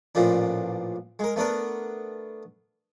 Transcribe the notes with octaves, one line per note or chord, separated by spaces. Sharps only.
A1 A#2 F3 D4
G#3 A#4
A3 B3 D4 A#4